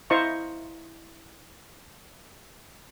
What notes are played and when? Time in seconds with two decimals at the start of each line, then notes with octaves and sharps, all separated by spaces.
0.10 E4 C5 D#5 F5 A#5 C#6